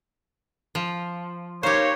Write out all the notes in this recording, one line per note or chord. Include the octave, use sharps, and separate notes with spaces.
F3
A#3 D#4 G4 C5 C#5